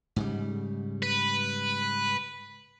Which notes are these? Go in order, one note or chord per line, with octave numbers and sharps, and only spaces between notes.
G#2 C#3 G3
B4